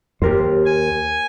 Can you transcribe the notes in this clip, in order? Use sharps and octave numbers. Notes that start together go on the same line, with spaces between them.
D#2 G4 A#4 C5
G#5